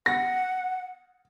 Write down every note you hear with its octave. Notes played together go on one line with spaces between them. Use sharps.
F#5 A#6